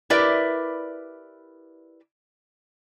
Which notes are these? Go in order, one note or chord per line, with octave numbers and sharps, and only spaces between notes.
E4 G4 A#4 B4 D5 E5